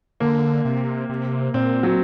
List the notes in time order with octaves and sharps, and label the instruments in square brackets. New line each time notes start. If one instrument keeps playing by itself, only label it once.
[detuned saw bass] D3 [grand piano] A#3
[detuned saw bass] C3
C3
[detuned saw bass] A#2 [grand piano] C4
[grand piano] F#3